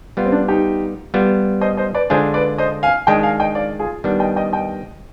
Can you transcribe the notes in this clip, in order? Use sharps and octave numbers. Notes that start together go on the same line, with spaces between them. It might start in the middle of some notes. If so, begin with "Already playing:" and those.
G3 B3 F4
C4
D4
D#4 G4
G3 B3 F4
C5 D#5
C5 D#5
B4 D5
D3 G#3 D4 F4 G#4 C5
B4 D5
C5 D#5
F5 G#5
D#3 G#3 D4 D#5 G5
F5 G#5
D#5 G5
D5 F5
F4 G#4
D#3 G3 B3 D4
D#5 G5
D#5 G5
D#5 G5